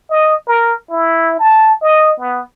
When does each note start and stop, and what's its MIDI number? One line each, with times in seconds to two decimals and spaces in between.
0.10 0.35 75
0.47 0.73 70
0.90 1.38 64
1.39 1.73 81
1.82 2.13 75
2.20 2.41 59